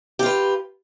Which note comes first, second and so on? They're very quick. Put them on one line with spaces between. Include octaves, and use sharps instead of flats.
G4 F4 B4